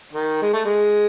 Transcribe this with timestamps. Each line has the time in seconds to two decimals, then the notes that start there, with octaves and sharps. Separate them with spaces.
0.13 D#3
0.42 G#3
0.53 A3
0.65 G#3